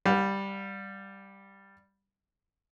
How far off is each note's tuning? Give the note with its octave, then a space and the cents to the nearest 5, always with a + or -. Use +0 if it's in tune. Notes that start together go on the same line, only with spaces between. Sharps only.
G3 +0 F#5 -45